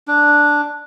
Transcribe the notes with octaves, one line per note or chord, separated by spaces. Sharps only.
D4